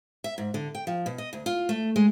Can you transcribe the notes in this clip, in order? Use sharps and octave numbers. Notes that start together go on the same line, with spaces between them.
E5
G#2
D3
G5
F3
B2
D#5
D2
F4
A3
G#3